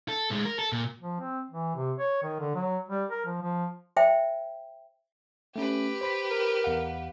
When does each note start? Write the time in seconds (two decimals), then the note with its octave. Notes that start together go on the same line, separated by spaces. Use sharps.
0.08 A4
0.30 A2 G#3
0.45 A#4
0.59 A4
0.72 A#2
1.01 F3
1.20 C4
1.51 E3
1.76 C3
1.99 C#5
2.23 D#3
2.39 D3
2.55 F#3
2.89 G3
3.11 A#4
3.26 F3
3.42 F3
3.97 C5 E5 G5
5.56 A3 C#4 G4 B4
6.01 C5 B5 B6
6.31 A#4
6.64 E2 F5 F#5